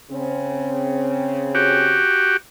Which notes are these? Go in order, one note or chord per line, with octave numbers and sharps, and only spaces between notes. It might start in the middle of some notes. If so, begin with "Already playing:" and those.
C#3 C4
F#4 G4